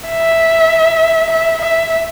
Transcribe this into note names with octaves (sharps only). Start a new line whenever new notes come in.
E5
E5
E5